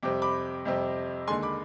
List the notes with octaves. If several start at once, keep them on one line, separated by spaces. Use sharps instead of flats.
F2 C3 G3 C4 D6
B5 D6
F2 C3 G3 C4
D#2 D3 G#3 G#5 C6
B5 D6